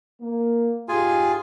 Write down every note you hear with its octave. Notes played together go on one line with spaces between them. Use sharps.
A#3
G#2 G#3 F4 G4 G#4 G#5